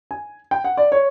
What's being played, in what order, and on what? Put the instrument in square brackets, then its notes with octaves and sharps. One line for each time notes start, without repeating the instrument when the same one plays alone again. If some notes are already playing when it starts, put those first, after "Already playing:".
[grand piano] G#5
G5
F#5
D5
C#5